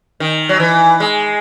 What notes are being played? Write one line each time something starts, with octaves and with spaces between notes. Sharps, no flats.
D#3
F#3
E3
G#3